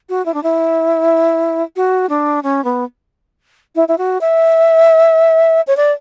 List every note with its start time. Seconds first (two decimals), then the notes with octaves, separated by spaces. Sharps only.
0.09 F#4
0.26 E4
0.34 D4
0.43 E4
1.76 F#4
2.09 D4
2.43 C#4
2.64 B3
3.76 E4
3.88 E4
3.98 F#4
4.21 E5
5.67 C#5
5.77 D5